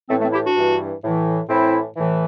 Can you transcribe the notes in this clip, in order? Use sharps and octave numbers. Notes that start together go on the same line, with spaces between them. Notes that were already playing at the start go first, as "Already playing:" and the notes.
A2 E3 A3 C4
A3 C4
E4 G4
D4 F#4
G2 E3
A2 E3
A2 E3 C4 E4
A2 E3